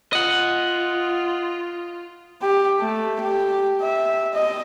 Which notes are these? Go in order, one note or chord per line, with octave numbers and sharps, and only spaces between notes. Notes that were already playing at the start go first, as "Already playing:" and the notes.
F4 D#5 F#5
G4
A3
G4
E5
D#5